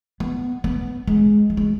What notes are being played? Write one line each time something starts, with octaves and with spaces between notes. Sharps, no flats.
B3
B3
G#3
F#3
G#3